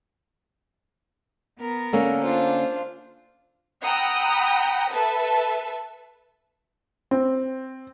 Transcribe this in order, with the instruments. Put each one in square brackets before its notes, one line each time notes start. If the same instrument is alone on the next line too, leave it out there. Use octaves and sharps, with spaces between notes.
[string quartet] B3 A#4
[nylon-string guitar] D3 A#3 C#4
[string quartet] D4 F4 C5
[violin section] F#5 G5 A#5 B5 D#6 E6
A4 B4 E5 A5
[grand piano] C4